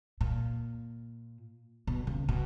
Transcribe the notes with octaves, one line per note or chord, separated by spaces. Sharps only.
A#2
B2
C#3
B2